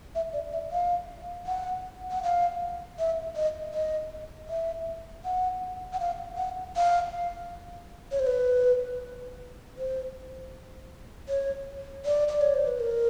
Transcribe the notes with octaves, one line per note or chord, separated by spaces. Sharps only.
E5
D5
E5
F5
F#5
F#5
F5
E5
D#5
D#5
E5
F#5
F#5
F5
F#5
F5
C#5
C5
B4
C5
C#5
D5
D5
C#5
C5
B4
A#4